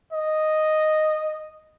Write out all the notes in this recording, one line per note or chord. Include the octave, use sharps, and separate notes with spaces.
D#5